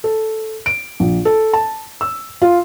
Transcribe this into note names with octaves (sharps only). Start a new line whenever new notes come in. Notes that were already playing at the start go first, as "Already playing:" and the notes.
A4
D7
A#1
A4
A5
E6
F4